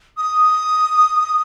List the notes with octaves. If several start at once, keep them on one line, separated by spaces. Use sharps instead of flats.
D#6